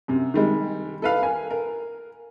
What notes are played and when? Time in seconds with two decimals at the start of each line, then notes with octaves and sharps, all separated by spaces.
0.08 F#2 C3
0.34 D#3 G3 G#3
1.02 A4 B4 F5
1.22 A#4 G#5
1.51 A#4